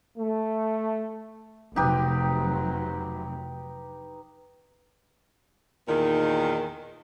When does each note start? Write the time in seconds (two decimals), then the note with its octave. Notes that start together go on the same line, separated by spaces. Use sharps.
0.18 A3
1.76 F1 C3 F#3 D#4 G4 B4
5.88 E2 A#2 D#3